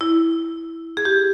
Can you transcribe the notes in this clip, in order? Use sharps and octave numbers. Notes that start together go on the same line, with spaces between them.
E4
G#4
G4